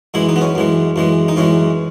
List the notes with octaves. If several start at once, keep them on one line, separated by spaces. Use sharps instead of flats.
F#2 E3 G#3 E4
D#4
B3
C#4
F#2 E3 G#3
F#2 E3 G#3
D#4
F#2 E3 G#3 C#4